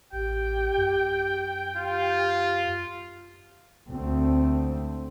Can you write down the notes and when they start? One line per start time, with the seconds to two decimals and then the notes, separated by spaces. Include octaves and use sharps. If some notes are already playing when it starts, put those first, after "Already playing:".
0.13 A1 G4 G5
0.78 F#2
1.77 F4 G4
3.88 D2 A3 C4